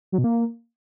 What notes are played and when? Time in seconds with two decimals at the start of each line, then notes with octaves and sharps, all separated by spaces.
0.12 F#3
0.18 B2
0.24 A#3